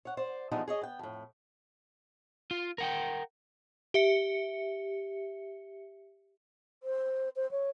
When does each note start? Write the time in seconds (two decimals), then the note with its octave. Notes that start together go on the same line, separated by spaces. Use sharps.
0.05 C#5 F#5
0.17 C5 D5
0.51 E3 F3 G3 G#3 B3 D#4
0.68 G#4 C#5 D#5
0.81 B3 G5
0.99 F2 A2
2.51 F4
2.78 A#4 F#5 G5
3.94 G4 E5 C#7
6.83 C5
7.36 C5
7.51 C#5